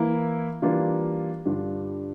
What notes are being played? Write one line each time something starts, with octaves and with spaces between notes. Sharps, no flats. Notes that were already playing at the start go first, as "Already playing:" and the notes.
Already playing: E3 A#3 E4
E3 G3 A#3 D4 F4
G2 D3 G3 D4 F4